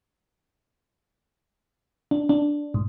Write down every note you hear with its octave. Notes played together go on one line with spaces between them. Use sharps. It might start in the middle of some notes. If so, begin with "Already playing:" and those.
D4
D4
G#2